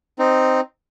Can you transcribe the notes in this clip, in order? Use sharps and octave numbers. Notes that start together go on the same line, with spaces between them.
C4 D#4